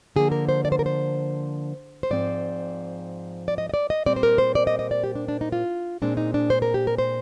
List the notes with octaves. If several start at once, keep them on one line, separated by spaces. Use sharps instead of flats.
D3 F3 A#3 G#4
A#4
C5
D5
C5
A#4
C5
C5
G#2 F3 C4 D5
D5
D#5
D#5
D5
D#5
A#2 G3 C4 D5
C5
A#4
C5
D5
D#5
D#5
D5
G4
D4
D4
D#4
F4
A#2 G#3 C4 D4
D#4
D4
C5
A#4
G4
A#4
C5